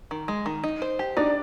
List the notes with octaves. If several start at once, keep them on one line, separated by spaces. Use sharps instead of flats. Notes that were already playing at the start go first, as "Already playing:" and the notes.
D#3
G#3
D#3
D#4
C5
G4
D4 D#4 D5